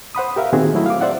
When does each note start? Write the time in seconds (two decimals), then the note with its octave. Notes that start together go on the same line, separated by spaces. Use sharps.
0.15 C5 F#5 B5 D#6
0.36 G4 A#4 E5 F5
0.53 A#2 D#3 C4 F#4 G#4
0.74 F#3 A3 E4 F#4
0.86 F5 D6
1.01 C5 D5 E5 F#5